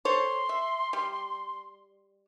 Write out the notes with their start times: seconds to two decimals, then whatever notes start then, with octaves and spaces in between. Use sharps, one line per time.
0.05 A4 C5 C#5 C6
0.49 E5
0.93 G3